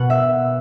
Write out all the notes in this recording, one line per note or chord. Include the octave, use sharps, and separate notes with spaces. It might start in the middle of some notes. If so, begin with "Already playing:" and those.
Already playing: B2 F#5
E5